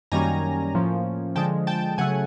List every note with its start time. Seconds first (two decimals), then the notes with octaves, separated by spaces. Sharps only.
0.12 F#2 D#3 G3 A#3 C#4 G#5 A#5
0.75 A2 F3 A#3 C#4
1.36 D3 F3 G#3 G5 A5
1.67 G5 A5
1.98 C#3 F#3 A3 F#5 G#5